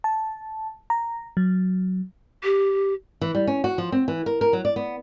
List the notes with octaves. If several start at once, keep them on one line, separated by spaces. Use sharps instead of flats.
A5
A#5
F#3
G4
E3
G3
C#4
F#4
F3
C4
E3
A#4
A#4
F#3
D5
B3